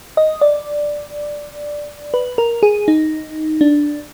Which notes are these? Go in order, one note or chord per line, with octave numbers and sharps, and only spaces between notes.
D#5
D5
B4
A#4
G#4
D#4
D4